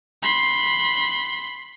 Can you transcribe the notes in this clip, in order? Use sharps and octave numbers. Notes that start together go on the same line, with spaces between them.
B5 C6